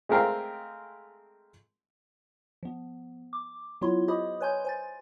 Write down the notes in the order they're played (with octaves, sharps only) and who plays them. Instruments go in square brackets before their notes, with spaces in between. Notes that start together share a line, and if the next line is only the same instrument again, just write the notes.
[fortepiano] G#3 A3 C4 A#4 F5 G5
[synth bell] F3 B3
D6
F#3 B3 E4 F4 C#5 C6
G4 C5 D#5 B5 D#6
B4 C#5 G#5 C6 G6
C5 G#5 A6